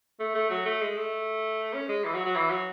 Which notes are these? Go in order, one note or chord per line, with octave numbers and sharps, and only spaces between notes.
A3
A3
F#3
A3
G#3
A3
C#4
G#3
E3
F#3
F#3
E3
F#3